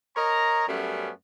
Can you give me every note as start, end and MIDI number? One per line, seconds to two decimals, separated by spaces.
0.15 0.66 70
0.15 0.66 73
0.15 0.66 75
0.15 0.66 82
0.67 1.10 42
0.67 1.10 55
0.67 1.10 57
0.67 1.10 59
0.67 1.10 61